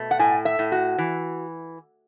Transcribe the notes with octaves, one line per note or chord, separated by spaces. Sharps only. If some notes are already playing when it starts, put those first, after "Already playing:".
Already playing: B2 A3
F#5
A2 G#5
E5
A2
F#4
E3